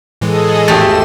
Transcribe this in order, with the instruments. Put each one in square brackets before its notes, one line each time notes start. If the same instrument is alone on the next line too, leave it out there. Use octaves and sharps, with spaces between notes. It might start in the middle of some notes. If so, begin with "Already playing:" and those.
[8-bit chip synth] A2 E3 G#3 [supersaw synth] G#4 A4 D#5
[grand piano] G#1 G4 A6 [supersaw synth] E2 E7 [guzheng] A3